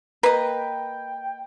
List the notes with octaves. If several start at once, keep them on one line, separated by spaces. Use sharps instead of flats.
A#3 B4 D#5 G5